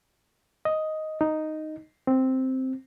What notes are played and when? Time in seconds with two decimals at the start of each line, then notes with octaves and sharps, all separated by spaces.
0.65 D#5
1.21 D#4
2.07 C4